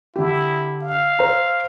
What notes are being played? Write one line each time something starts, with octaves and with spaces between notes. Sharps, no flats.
D3 E4 G4
F5
C5 A#5